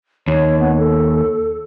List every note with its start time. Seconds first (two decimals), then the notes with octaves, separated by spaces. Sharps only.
0.28 D#2 C#5
0.60 B3
0.78 A4